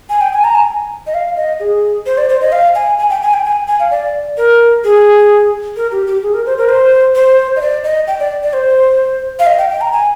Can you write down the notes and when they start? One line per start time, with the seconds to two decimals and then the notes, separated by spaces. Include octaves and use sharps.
0.10 G#5
0.21 G5
0.33 G#5
0.44 A#5
0.55 G#5
1.07 D#5
1.14 F5
1.37 D#5
1.60 G#4
2.06 C5
2.18 D5
2.29 C5
2.41 D#5
2.52 F5
2.75 G#5
2.99 G#5
3.10 G5
3.22 G#5
3.33 G5
3.45 G#5
3.68 G#5
3.80 F5
3.91 D5
4.37 A#4
4.84 G#4
5.76 A#4
5.92 G4
6.07 G4
6.23 G#4
6.34 A#4
6.46 C5
6.58 A#4
6.69 C5
7.15 C5
7.56 D#5
7.61 D5
7.84 D#5
8.07 G5
8.20 D5
8.43 D5
8.53 C5
9.39 F5
9.46 D#5
9.58 G5
9.70 G5
9.81 A#5
9.93 G#5